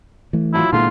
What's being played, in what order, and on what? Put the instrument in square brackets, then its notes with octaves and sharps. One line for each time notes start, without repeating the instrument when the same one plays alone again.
[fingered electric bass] E3 A3
[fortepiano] A2 F#3 F4 [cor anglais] E4
[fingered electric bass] A#2 A#3 [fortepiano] D3 E3 G#3 [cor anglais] F4